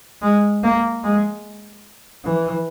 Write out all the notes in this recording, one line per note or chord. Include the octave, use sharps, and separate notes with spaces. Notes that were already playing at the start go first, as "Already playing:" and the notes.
G#3
A#3
G#3
E3